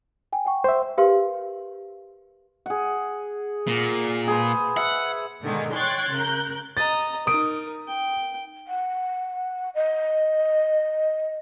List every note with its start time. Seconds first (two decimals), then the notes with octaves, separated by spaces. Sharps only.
0.33 G5 G#5
0.46 F#5 G5 C#6
0.64 C5 E5
0.98 G4 A#4 B4 F5 C6
2.66 G#4 F#5
3.68 A#2
4.27 G#4 B4 C5
4.77 E5 F#5
5.42 G#2 B2 D3 D#3 G#3
5.73 C#5 G5 C6 F#6 G#6 A6
6.12 C#3 A#4 F#6 G6
6.77 D#5 A#5 A6
7.27 D#4 A#4 D#6 D7
7.87 G5
8.67 F#5
9.75 D#5